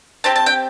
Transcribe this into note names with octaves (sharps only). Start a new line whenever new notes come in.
C4 G4 A5
A5
G5